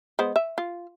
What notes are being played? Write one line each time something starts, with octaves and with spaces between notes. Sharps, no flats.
G#3 B3 C5
E5
F4